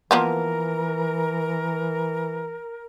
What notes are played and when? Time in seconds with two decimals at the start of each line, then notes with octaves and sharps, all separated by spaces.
0.11 E3 F3 A#3 B3 A#4